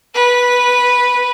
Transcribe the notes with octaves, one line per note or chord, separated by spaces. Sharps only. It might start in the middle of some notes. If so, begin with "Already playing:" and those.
B4